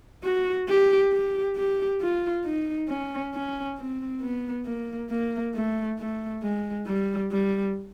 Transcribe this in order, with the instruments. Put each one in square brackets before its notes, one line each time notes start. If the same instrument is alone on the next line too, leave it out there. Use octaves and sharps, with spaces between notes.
[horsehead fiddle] F#4
G4
G4
G4
F4
D#4
C#4
C#4
C4
B3
A#3
A#3
A3
A3
G#3
G3
G3